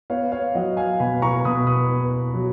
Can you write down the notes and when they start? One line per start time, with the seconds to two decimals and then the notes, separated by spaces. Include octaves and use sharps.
0.10 B3 C#5 F5
0.32 C#5 F5
0.55 F#3 D#5 F#5
0.77 F5 G#5
1.00 B2 G#5 B5
1.22 A#5 C#6
1.45 B2 B5 D#6
1.67 B5 D#6
1.90 B3
2.34 F#3